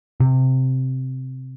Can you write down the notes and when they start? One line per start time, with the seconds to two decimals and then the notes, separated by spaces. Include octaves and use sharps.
0.20 C3